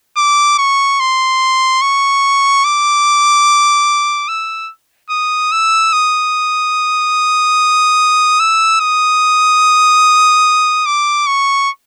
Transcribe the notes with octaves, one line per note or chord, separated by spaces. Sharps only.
D6
C#6
C6
C#6
D6
E6
D#6
E6
D#6
E6
D#6
D6
C#6